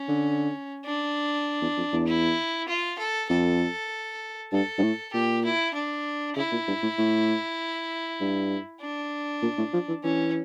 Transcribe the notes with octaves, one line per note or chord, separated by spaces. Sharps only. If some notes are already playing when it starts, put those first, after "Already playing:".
Already playing: C#4
D3
D4
E2
F2
E2
E4
F4
A4
F2 A4
G2 A4
G2
A2
A#2 G4
E4
D4
C#3 E4
A#2
G2
A2
A2
G2
D4
A#2
A2
F3
E3
E3 C#4